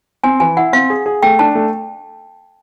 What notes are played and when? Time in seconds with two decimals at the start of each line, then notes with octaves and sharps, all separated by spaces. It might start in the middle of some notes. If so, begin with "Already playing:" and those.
0.24 C4 G#5
0.40 E3 G#5
0.57 E4 F#5
0.73 C4 F5
0.90 G#4
1.06 G#4
1.23 A3 G5
1.39 D4 A5
1.55 A3